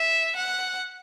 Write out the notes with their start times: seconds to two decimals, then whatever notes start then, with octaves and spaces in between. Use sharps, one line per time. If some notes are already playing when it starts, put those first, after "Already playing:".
Already playing: E5
0.36 F#5